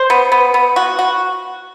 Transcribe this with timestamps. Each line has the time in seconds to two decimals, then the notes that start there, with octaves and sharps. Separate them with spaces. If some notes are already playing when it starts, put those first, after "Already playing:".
Already playing: C5
0.10 B3
0.32 B3
0.54 B3
0.76 F#4
0.99 F#4